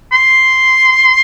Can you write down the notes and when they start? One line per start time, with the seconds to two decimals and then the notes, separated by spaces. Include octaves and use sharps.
0.12 C6